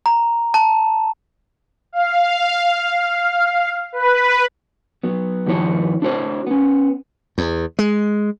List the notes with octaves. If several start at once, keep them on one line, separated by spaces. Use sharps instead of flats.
A#5
A5
F5
B4
F#3 B3
G2 D#3 F3 E4 C#5
D4 E4 F#4 G#4 C5 C#5
B3 C#4
E2
G#3